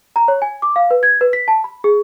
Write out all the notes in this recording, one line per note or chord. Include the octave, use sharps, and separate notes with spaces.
A#5
C#5
G#5
D6
F5
B4
G#6
B4
B6
A5
B5
G#4